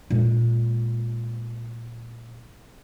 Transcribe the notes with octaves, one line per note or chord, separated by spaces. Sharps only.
A#2 G#3